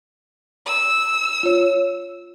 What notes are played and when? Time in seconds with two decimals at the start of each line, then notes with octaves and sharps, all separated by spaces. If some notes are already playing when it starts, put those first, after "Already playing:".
0.66 E6
1.43 F4 C#5